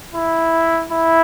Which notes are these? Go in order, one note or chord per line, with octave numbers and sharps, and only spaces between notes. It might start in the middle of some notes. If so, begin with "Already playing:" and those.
E4
E4